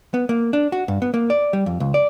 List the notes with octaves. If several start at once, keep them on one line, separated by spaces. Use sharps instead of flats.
B3
A#3
D4
F#4
G2
B3
A#3
D5
G3
F2
C#2
D5